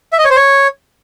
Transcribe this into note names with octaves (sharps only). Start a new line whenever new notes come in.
E5
D#5
C#5
C5
C#5